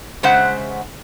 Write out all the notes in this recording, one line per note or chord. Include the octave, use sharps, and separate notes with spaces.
C#3 G#3 C5 E5 F#5